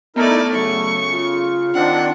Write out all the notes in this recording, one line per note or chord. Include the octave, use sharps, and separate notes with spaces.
A3 B3 D#4 E4 A#4 D5
C#3 F#3 A3 C#6
F4
D#3 C4 D4 F#5